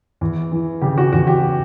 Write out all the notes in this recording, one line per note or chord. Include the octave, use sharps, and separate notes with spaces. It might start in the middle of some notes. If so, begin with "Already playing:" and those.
E2
E3
C#3 G4
F#4
E2 F#4
G4